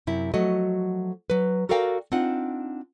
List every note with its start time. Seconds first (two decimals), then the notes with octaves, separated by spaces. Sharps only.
0.07 F#2 C3 E4
0.34 F3 F#3 A3 F#4 D#5
1.30 F#3 B4
1.69 F#4 A4 A#4 D5 F5 G5
2.12 C4 D4 D#4 F4 F#5